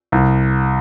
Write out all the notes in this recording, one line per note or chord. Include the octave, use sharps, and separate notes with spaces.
C2